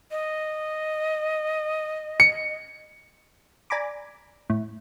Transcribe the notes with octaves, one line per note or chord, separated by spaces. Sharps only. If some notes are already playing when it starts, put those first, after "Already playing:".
D#5
C#7
D5 G#5 A#5 B5 D6
A2